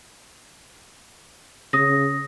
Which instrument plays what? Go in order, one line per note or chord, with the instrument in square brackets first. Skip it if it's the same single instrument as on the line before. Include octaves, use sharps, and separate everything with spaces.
[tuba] C#3 [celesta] D#6 A#6